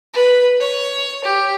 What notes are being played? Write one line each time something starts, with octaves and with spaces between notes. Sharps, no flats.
B4
C#5
G4